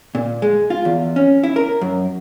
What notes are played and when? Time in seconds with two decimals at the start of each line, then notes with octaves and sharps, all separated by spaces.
0.15 A#2
0.42 G#3
0.70 F4
0.85 E2
1.16 C#4
1.43 E4
1.56 A#4
1.81 F#2